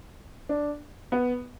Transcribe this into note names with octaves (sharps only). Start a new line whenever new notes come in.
D4
B3